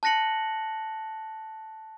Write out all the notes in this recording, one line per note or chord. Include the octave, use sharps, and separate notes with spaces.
A5 F#6 A#6 C#7 F#7